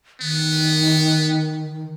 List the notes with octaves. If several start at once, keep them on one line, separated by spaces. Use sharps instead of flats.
D#3 B3